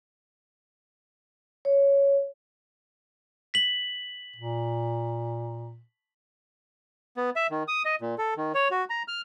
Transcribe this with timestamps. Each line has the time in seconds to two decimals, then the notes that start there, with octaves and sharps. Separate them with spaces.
1.65 C#5
3.54 B6 F#7
4.36 A#2
7.17 B3
7.36 E5
7.50 D#3
7.68 D#6
7.85 D#5
8.01 A#2
8.18 A4
8.37 D#3
8.55 C#5
8.71 F#4
8.90 A#5
9.08 F6